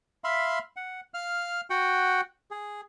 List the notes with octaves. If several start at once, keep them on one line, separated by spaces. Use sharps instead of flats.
E5 F5 B5 C6
F#5
F5 F6
F#4 F#5 G5
G#4